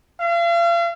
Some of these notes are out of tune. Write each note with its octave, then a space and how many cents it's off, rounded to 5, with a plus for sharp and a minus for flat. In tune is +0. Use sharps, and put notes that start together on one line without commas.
F5 -40